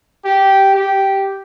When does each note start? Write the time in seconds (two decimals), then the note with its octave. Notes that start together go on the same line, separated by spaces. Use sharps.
0.25 G4
0.75 G4